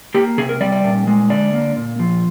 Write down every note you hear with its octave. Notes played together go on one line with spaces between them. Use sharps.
A#3 G4
C3 G#4
A#4
G3 D5
D5
A#2
G#3
D3 D5
A#3
A#2
F3